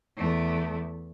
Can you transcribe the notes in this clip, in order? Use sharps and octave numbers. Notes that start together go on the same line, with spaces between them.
E2 A3